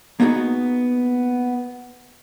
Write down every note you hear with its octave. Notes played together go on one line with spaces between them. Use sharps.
A#3 B3 D#4 F#4 G#4